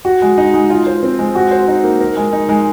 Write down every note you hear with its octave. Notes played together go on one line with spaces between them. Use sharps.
F#4
G#3
D#4
G#3
F4
C5
C4
G#3
F#4
C5
D#4
A#3
A#4
G#3
D#4
G#3